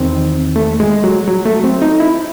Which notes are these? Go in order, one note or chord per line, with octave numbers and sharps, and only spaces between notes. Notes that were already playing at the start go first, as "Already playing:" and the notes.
Already playing: E2 D#3 C4
A3
G#3
F#3
F#3
A3
C4
D#4
E4